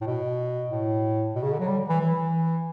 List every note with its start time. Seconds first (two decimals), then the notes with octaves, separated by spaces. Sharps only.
0.01 A2
0.07 B2
0.70 A2
1.35 B2
1.43 C#3
1.52 D3
1.59 F#3
1.67 G3
1.89 E3
2.00 E3